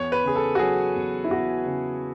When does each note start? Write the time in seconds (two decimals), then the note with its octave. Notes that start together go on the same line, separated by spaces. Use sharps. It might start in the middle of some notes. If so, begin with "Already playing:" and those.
Already playing: E2 C#5
0.12 B4
0.24 C#3 G#4
0.35 A4
0.55 F#4
0.59 F#3 G#4
0.96 E2
1.24 E4
1.30 E2 F#4
1.66 C#3